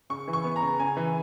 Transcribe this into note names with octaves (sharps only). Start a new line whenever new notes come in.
C#3 C#6
E3
C#6
B3
A#5
C#3
C#3 G#5
E3